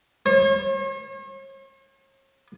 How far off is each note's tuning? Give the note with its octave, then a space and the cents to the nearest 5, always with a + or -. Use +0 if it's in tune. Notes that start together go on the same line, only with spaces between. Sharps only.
C#5 -45